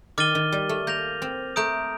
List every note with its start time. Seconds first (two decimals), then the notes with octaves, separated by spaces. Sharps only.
0.18 D#3 D6 F6 A6 D#7 G7
0.35 D#3
0.52 G3
0.69 A3
0.87 A#3 G6 A#6 F7
1.22 C4
1.56 A3 A#5 D#6 G6 D7